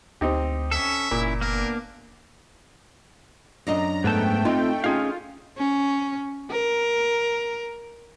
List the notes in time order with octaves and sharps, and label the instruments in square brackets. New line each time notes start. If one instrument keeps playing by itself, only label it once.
[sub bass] D2 [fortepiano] C4 D#4 G4
[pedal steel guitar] C#4 A4 [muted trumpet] E5
[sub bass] F#1 [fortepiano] A#2 [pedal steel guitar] C#4 E4
[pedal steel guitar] A#3 B3 D4 [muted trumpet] A#4
[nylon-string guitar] F#2 D4 D#5 [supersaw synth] A#5
[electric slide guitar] G#2 B3 A5 [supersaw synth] A3 G5
[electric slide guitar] C4 C#4 F4 [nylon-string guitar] D#4
[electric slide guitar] C#4 G#4 F5 [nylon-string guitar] D#4 [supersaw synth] F4
[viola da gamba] C#4
A#4